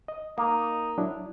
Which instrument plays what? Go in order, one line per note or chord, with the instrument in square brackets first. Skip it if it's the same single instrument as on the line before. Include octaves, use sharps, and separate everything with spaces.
[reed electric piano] D#5
[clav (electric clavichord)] A#3 [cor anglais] D#4
[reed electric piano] F#3 D4 E4